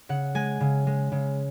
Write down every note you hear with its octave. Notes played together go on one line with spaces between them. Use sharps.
C#3 F#5
G#3 G#5
C#3
G#3
C#3